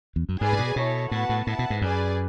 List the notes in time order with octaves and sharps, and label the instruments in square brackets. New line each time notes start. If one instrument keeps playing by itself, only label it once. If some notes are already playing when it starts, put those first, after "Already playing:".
[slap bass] E2
F#2
[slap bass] G#2 [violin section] G#4 B4 D5 G#5
[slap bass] A2
B2
[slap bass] B2 [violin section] E4 A4 C#5
[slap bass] A2 [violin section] B3 F#4 B4 F#5 A5
[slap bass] A2
[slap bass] A2 [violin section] E4 B4 F#5 A5
[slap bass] B2
G#2
[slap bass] F#2 [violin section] G#4 B4 D5 G#5